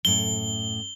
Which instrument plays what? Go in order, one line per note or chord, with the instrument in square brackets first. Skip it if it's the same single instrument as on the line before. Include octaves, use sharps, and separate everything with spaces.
[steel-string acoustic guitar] F#2 A2 [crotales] G7